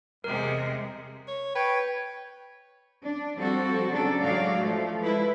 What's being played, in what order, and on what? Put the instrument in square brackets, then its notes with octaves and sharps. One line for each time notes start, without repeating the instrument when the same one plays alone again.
[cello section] E2 C3 G#3 [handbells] A#4
[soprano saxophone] C#5
[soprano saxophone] B4 [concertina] C#5 G5
[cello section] D4
F3 G3 C4 F#4 A4
C#3 F#3 D4 A4
A2 F#3 G#3 F#4 D5 F5
F3 A3
G#3 E4 B4